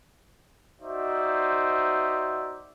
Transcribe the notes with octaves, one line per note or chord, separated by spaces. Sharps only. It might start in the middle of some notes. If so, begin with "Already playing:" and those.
D#4 F#4 C5 D5 E5